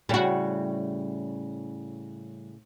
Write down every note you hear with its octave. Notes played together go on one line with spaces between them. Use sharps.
A2 C#3 G3 F#4